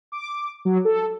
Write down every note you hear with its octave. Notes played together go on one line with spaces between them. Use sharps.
D6
F#3
A4